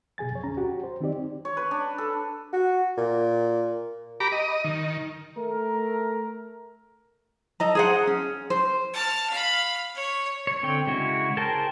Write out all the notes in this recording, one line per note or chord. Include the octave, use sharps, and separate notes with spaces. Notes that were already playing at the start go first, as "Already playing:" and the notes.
B2 G#4 G#5 A6
F2 C#5
D2 C#4 A#5
F#4 G4
C5
D#3 C4 D#4 G4 D5
C#5
B4
D4
A4
F#4
A#2
G4 A#5 B5 D6
D#5
D#3
A3 A#4
A4 D#5 A#5
G#4 C5 F#5
C#4
C5
A5 F6
F5 B5
C#5
C#5
D3 C4 C#5 G5
C#3 G#3 E4 F#4 C#5
G#4 A#4 C5 G5 A5